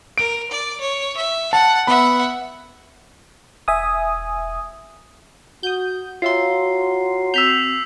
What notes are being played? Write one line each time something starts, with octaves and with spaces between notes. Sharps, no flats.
A#4 D7
D5
C#5
E5
F#5 A5
B3 E5 F#5 B5
E1 E5 G#5 D#6
F#4 D#6 G6
F4 F#4 C#5 E5 G5 A#5 C6 C7
C4 E6 G6 B6 C7 E7 F7